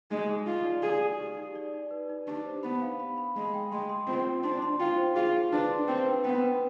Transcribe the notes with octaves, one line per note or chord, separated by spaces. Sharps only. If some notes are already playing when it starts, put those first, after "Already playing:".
G#3 D#4
G#4
D#4 F4
D5
G#4 D5
D#4
G4
D#4
D5
D#4
B4
D#4
D4 G4
C5
B3 B5
F5
B5
B5
G#3 B5
G5
G#3 C6
C6
C4 F4
C5
D4 C6
C6
F4 G5
C5
F4 G#4
G#4
D4 B4
C6
C4 G5
B4
B3 G5
B4